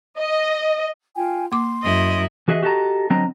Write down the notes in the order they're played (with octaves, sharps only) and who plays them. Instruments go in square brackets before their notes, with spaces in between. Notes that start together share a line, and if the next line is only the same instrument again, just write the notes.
[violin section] D#5
[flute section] F4 G5 G#5
[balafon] A#3 D6 [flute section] C6
[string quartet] F#2 E4 [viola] D#5
[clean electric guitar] E3 F#4 G#4 D#5 E5
F#4 G4 A4 D#5 A5 A#5
D3 F#3 C4 D#5 A#5